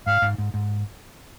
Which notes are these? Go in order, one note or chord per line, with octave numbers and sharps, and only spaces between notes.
G#2 F5
G#2
G#2
G#2